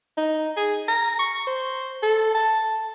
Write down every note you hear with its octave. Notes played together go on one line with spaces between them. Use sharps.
D#4
G#4
A#5
C#6
C5
A4
A5